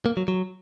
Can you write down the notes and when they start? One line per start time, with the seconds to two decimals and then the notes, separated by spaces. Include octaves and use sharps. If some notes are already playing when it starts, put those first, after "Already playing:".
0.06 A#3
0.17 F#3
0.28 F#3